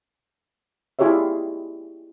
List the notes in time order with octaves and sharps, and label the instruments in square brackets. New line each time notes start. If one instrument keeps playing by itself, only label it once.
[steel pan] E4 F4 G4 G#4 C#5 E5